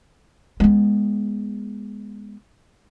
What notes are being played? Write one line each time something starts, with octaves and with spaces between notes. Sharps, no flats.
G#3 B3